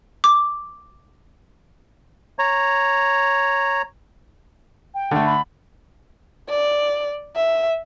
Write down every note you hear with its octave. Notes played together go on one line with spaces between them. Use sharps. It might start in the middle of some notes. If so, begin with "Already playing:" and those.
D6
C#5 A#5
G5
D3 A3
B5
D5
E5